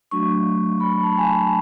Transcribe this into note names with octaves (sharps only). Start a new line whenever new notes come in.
F#3 A3 D4 F#4 C#6
B5
A5
G#5
A5